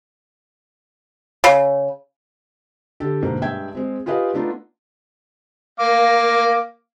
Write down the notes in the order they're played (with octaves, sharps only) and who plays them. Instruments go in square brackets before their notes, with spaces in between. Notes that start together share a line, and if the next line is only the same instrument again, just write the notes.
[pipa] C#3
[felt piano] D3 G4 A4
G#2 B2 D3 A#3
G2 G#3 E5 G5 G#6
G#3 C4
F4 G4 G#4 B4 D#5 F5
A3 B3 D4 D#4 F4
[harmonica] A#3 F5 D6